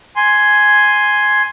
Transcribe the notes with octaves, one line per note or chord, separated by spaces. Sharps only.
G#5 C6